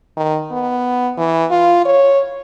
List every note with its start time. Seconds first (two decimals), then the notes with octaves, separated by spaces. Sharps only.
0.17 D#3
0.51 B3
1.18 E3
1.51 F4
1.85 C#5